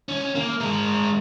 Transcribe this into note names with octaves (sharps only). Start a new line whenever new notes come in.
C#4
A#3
G#3 A#4